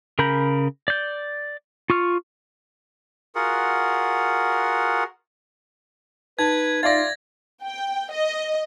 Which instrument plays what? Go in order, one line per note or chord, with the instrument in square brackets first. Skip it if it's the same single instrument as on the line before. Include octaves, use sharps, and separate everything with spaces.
[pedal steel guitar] C#3 A#4 A#5 B5 G6
D5 G6
F4 C#6 F6
[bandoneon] F4 F#4 G#4 A#4 F#5
[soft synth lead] D#4 [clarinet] B4 [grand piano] A5 [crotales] G#6
[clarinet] F4 [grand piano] D5 E5 F5 [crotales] A6 A#6
[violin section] G5
D#5